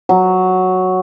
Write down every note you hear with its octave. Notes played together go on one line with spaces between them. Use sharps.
F#3